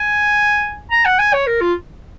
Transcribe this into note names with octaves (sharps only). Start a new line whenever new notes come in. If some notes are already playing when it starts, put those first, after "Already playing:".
Already playing: G#5
A#5
F#5
G#5
C#5
A#4
F4